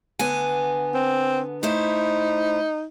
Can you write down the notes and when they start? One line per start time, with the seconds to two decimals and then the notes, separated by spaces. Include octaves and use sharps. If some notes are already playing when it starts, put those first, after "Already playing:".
0.19 D3 B3 G#5
0.94 C4
1.63 A3 D#4 E4 C5